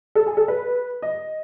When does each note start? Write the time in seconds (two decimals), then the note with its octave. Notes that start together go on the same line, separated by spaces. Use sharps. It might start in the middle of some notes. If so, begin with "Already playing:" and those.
0.15 A4
0.26 G#4
0.37 A4
0.48 B4
1.02 D#5